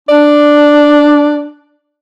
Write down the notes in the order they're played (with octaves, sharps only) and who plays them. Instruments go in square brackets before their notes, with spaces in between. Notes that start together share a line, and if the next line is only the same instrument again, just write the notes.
[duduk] D4 [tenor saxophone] D5